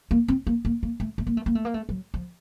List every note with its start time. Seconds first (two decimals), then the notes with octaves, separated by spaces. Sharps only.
0.11 A#3
0.28 C4
0.47 A#3
0.65 A#3
0.83 A#3
1.00 A3
1.18 A3
1.27 A#3
1.37 A3
1.46 A#3
1.55 A3
1.65 A#3
1.74 A3
1.89 F#3
2.14 F3